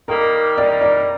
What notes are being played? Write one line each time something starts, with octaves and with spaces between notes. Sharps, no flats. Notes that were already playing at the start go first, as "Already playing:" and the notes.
D#3 G3 A#3 D#4 A#4
D#3 G3 A#3 D#4 D5
D5